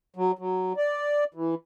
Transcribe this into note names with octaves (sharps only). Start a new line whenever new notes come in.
F#3
F#3
D5
E3